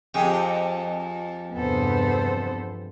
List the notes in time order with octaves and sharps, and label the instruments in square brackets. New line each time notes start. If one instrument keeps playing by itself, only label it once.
[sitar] F2 G#4 [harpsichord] G4 G5
[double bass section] E2 G2 C3 [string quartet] B3 A4 C5